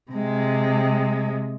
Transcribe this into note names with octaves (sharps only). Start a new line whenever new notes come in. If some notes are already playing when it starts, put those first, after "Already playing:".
C3 G#3